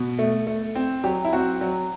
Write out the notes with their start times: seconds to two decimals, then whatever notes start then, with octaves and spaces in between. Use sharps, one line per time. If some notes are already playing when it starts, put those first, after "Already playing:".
Already playing: B2
0.19 A3
0.47 A3
0.75 C4
1.04 F#3 G4
1.25 E4
1.33 C4 F#4
1.61 F#3